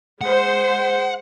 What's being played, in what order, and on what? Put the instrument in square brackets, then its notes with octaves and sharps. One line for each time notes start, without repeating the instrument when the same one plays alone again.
[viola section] G#3 C5 [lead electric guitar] F#5